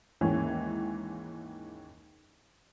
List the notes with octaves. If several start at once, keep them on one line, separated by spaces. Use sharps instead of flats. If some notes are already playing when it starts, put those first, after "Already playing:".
D#2 G#2 D#3 E3 G#3 C#4